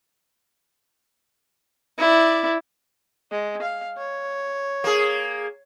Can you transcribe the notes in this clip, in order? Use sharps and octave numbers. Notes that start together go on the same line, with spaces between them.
E4 D5
G#3
F5
C#5
A#3 G#4